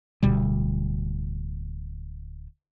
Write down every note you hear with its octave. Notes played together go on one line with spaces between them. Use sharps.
D1 D2 B2 G3